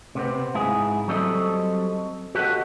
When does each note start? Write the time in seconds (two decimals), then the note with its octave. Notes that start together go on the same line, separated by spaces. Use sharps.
0.15 C3 B3 C4
0.54 G#2 E4 G#4
1.08 F#3 G3 C4 A4 D#5
2.35 F#4 G4 A4 C5 D#5 F#5